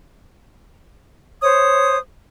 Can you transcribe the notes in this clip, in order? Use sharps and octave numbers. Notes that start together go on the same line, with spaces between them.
C5 C#5 D#6